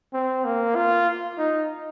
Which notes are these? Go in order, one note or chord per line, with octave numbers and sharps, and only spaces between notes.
C4
A#3
F4
D#4